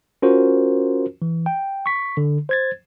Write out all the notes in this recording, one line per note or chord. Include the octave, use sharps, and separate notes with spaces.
C#4 F4 F#4 A#4 C5
E3
G5
C#6 B6
D3
C5 G#6 A6